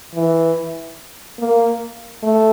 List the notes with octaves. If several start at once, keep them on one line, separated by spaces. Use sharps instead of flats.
E3
A#3
A3